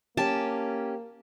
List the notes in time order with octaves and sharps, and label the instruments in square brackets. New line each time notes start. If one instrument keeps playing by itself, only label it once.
[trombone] A#3 [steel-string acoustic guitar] C#4 G4 [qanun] A5